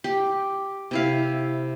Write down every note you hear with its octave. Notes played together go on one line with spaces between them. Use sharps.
G4
C3 E4 F5